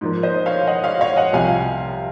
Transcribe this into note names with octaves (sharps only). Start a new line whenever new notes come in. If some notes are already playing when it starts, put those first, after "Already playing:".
G#2 F3 A#3
C5 D#5
C#5 F5
D#5 F#5
C#5 F5
C#5 F5
D#5 F#5
C2 C3 F3 F5 G#5